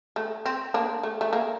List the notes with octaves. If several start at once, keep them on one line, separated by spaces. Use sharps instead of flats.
A3
C4
A#3 D4
A3
A3
A#3